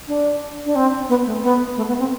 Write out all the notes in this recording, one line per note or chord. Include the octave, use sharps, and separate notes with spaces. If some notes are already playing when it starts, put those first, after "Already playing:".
D4
D4
C4
B3
A3
B3
A3
B3
C4